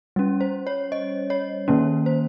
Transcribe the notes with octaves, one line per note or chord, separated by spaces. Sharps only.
G3 C#4
C5
C#5
D#5
C#5
D#3 A#3 C#4
C5